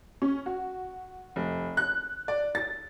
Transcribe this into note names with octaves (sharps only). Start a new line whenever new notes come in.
C#4
F#4
F1
F#6
D5
A6